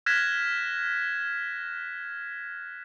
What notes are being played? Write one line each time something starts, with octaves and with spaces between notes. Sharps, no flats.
F6 F#6 G#6 A#6 B6 E7